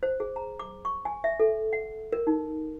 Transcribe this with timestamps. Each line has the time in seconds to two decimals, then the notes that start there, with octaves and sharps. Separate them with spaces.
0.03 C5
0.20 G#4
0.36 A#5
0.59 D6
0.85 C#6
1.05 G#5
1.24 E5
1.40 A4
1.73 F#5
2.12 A#4
2.27 D#4